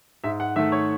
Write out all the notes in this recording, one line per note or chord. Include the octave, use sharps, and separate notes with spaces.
G#2 E5
F#5
D#3 A3 E5
C#5